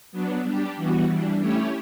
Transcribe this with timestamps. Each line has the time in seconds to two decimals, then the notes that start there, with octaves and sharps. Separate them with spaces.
0.12 F#3 B3 D4
0.44 G3 D4 G4
0.77 E3 G3 B3 F#4
1.08 E3 G3 D4
1.40 A3 C#4 E4 G4 C#5